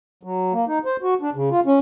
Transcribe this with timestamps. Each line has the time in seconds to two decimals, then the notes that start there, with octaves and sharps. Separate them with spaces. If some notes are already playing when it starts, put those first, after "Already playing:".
0.23 F#3
0.53 A#3
0.67 D#4
0.85 C5
1.02 F#4
1.21 D4
1.35 C#3
1.51 F4
1.66 C#4